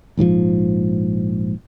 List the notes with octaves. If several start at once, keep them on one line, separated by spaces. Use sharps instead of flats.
A#1 G#2 E3 F3